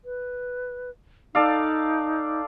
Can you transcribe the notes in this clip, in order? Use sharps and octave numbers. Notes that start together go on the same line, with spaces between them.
B4
D#4 A4 D5 F5